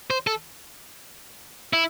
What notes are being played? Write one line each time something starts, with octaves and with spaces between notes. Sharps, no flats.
C5
A4
E4